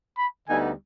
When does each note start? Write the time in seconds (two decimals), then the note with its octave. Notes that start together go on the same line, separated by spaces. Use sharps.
0.18 B5
0.48 D2 D3 G3 B3 D#4 G#5